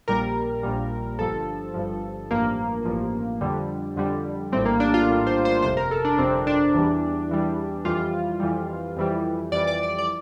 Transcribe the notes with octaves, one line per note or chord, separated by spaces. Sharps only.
A#1 A#2 G3 A#4
A#1 A#2 G3
G1 G2 F3 A4
G1 G2 F3
A1 G2 F3 A#3
A1 G2 F3
F2 D3 G3
F2 D3 G3
A#1 A2 G3 C4
A#3
D4
F4
A#1 A2 G3
C5
C5
G1 F2 C3 C5
A#4
A4
D4
G1 F2 C3 C4
D4
E2 E3 G3
E2 E3 G3
F2 E3 G3 F4
F2 E3 G3
F2 E3 G3
F2 E3 G3 D5
D5
D5
D5